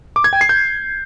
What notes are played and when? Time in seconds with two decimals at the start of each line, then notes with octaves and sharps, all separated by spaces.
0.16 D6
0.24 G#6
0.33 G5
0.41 C7
0.49 G6